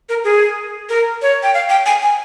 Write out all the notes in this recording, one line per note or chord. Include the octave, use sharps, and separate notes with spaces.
A#4
G#4
A#4
C#5
G5
F5
G5
G#5
G#5